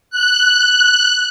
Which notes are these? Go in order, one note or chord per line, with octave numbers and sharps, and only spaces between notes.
F#6